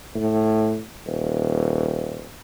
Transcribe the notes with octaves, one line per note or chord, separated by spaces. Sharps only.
A2
D#1